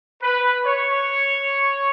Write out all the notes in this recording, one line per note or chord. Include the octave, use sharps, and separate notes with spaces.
B4
C#5